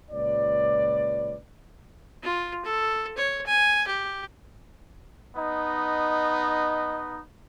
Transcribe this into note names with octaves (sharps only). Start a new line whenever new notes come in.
C#2 A#2 B4 C#5 D5
F4
A4
C#5
G#5
G4
B3 D#4 D#5